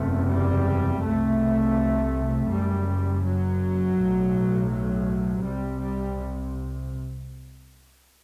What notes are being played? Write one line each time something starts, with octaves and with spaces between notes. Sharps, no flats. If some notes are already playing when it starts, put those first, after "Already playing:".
Already playing: F#1 E2 C3 A3
G3
C2 C3 A3
F#1 F#2 G3
F#3
B1 A2
F#3
C2 C3 G3
G3